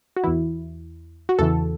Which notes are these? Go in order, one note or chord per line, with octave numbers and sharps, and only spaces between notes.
F#4
E2 E3 E4
F#4
E2 C#3 E3 A4